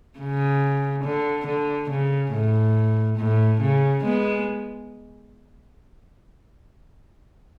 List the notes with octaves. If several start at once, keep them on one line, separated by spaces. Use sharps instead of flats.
C#3
D3
D3
C#3
A2
A2
C#3
G#3 B3